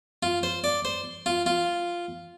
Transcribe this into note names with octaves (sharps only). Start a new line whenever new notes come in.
F4
C5
D5
C5
F4
F4